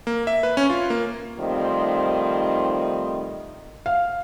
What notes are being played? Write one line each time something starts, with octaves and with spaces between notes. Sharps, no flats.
A#3
E5
B4
C#4
F4
A#3
D#3 F3 G3 A3 C4 D#4
F5